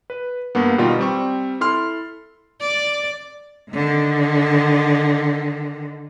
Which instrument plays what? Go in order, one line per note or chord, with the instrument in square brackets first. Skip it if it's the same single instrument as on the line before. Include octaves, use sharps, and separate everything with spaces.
[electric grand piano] B4
G2 A#3 B3
B2 D#3 G3 F4 A#4
G3 C4 C#6
E4 A4 C6 F6
[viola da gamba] D5
[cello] D3 D#3